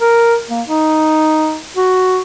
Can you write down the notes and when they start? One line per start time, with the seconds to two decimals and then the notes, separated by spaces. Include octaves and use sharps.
0.01 A#4
0.50 A#3
0.67 D#4
1.77 F#4